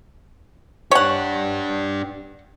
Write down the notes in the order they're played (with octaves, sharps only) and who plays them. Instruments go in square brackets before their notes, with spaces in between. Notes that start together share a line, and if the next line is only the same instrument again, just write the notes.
[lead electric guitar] D4 G4 [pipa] C#5 F#5